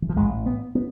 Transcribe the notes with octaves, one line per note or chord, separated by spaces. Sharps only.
E3
F3
A1 A2 G#3
B3
B3